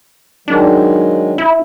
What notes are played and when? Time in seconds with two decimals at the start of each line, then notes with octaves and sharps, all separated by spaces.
0.48 D#3 F#3 G#3 D4
1.38 E4